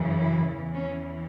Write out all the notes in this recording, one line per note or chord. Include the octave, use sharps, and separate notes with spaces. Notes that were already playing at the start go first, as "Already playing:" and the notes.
Already playing: F#2 C#3 E3
E4
E2 E3
C#4